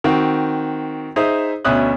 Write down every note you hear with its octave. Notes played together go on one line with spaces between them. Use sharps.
D#3 C4 F#4
D#4 G#4 C5 E5
D2 B2 C#4 E5 D#6 F#6